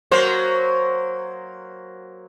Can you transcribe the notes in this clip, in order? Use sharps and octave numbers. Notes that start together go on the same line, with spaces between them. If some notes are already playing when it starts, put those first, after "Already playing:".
F#3 A#3 C5